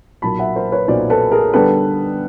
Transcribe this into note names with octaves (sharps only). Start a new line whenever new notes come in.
B1 A#2 F#3 A#3 A5 B5
E5 F#5
A#4 C5
B4 C#5
B1 A#2 F#3 A#3 C5 D5
A4 B4
G#4 A#4
D3 G3 B3 A4 B4